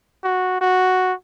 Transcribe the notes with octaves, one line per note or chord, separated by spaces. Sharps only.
F#4
F#4